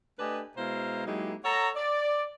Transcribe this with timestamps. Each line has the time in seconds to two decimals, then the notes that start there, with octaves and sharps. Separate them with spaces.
0.18 A3 D4 G4 B4 D#5 G#5
0.56 B2 G#3 E4 C5 F5 A#5
1.06 F#3 G#3 A#3 D#4 E4 G4
1.44 A4 C#5 F#5 A#5
1.76 D5